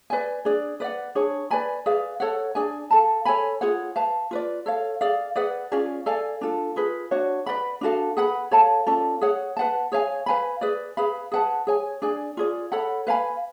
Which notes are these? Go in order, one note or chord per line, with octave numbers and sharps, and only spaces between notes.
B4 D5 G#5
D4 G#4 D5
B4 D5 F#5
D4 G#4 C#5
B4 D5 G#5 B5
G#4 B4 D5 F5
A4 C#5 F#5
D4 G#4 D5 G#5
A4 F5 A5
A4 C#5 G#5 B5
F4 G#4 C#5 F#5
B4 F5 A5
F4 B4 D5
A4 C#5 F5
G#4 D5 F5
G#4 B4 D5 F#5
C#4 F4 G#4 D5
A4 D5 F5 G#5
D4 F4 A4
F4 G#4 B4
D4 F#4 C#5
B4 D5 F#5 B5
D4 F#4 A4 F5
G#4 B4 F#5 B5
A4 C#5 F5 A5
C#4 F4 A4 D5
G#4 C#5 F#5
B4 F#5 A5
G#4 C#5 F5 G#5
B4 F5 G#5 B5
G#4 B4 D5
G#4 B4 F5 B5
G#4 B4 F#5 A5
G#4 C#5 G#5
D4 G#4 D5 G#5
F4 G#4 D5
A4 C#5 F#5 B5
B4 F5 G#5 B5